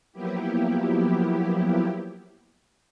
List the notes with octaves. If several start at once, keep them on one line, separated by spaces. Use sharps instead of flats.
F3 F#3 A#3 B3 E4 G4